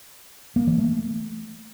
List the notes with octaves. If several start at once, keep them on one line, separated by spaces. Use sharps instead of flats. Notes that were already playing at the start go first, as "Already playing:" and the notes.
A#3
E3
A3